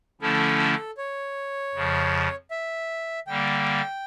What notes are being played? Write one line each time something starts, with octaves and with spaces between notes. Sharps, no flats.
D3 F3 A3 C#4 E4 A4
C#5
F2 C#3 F3
E5
D3 G3 A#3 G5